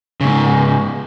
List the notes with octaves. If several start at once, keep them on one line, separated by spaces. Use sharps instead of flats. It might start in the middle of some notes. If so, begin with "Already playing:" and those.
G#2 C#3